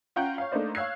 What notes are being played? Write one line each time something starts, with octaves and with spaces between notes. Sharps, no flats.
C#4 F4 F#5 G5 A#5 G6
C#5 F5
A3 A#3 D4 D#4 C5 D5
C#5 F5 E6 F#6 G#6 C7